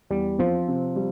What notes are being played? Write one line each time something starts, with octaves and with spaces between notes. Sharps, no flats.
E2 G3
F3 C4
C3
G3